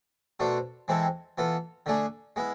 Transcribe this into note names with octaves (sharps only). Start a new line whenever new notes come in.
B2 A3 D4 A4 C5
E3 G#3 C4 E4 A4
E3 B3 F4 A4
D3 A3 D4 G#4
G#3 B3 E4